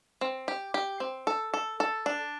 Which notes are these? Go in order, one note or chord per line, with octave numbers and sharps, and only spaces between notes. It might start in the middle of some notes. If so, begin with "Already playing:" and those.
C4
G4
G4
C4
A4
A4
A4
D4